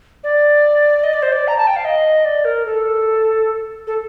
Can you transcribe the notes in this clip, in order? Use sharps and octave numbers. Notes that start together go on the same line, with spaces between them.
D5
D#5
D5
C5
D5
A#5
A5
G5
F5
D#5
D5
A#4
A4
A4